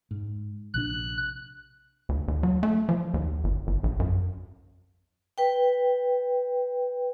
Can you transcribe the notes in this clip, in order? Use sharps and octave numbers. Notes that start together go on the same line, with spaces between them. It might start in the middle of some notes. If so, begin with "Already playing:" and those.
G#2
A#1 C3 D4 F#6
D2
D#2
F#3
A3
F3
D#2
G1
G1
A#1
F#2
B4 G5